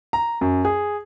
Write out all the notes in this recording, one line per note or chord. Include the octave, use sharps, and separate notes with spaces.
A#5
F#2
G#4